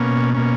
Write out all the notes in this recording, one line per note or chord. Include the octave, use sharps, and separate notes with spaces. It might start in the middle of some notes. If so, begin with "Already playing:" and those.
Already playing: B2 A#3 C#4
B2 A#3 C#4